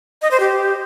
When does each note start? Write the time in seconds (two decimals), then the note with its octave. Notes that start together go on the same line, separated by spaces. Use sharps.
0.22 D#5
0.31 C5
0.40 G4